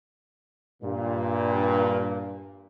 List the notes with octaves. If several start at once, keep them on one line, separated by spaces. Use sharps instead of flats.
G2 A#2